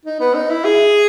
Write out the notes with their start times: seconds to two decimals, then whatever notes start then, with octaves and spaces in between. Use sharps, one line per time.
0.06 D#4
0.20 B3
0.34 D#4
0.50 E4
0.65 G#4